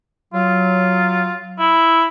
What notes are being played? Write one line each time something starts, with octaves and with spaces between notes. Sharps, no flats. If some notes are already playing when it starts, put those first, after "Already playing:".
F#3 F4
E4